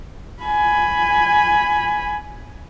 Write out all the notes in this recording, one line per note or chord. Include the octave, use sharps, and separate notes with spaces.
G#5 B5